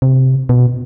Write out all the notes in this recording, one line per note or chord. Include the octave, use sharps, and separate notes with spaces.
C3
B2